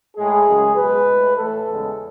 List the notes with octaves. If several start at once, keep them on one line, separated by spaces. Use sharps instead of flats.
A2 G#3 G#4
F#2 C#3 G#3
B2 G#3 B4
A2 G#3
A2 E3 A3 A4
E2 C#3 G#3